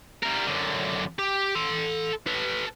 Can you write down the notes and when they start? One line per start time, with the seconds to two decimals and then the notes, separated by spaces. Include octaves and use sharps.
0.23 G3 A#4
0.47 F#2 D3
1.19 G4
1.55 A4 C6
2.27 A4 B4